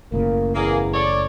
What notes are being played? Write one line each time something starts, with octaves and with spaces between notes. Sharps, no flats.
F#1 A2 C#3 A#3
E2 A#3 G#4
A4 C#5 D5